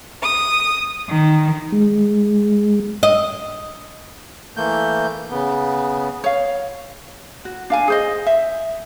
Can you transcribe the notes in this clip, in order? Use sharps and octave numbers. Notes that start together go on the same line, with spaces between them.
D#6
D#3
G#3
D#5
E3 A3 A#3 G6
C#3 B3
C#5 F5
F#4
D4 F5 G#5
G#4 C5 D#5
E5